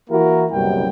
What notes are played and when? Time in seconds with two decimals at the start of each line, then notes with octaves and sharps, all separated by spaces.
0.10 E3 A#3 E4 F#4 A#4
0.52 F#1 C2 F#2 B2 G3 G5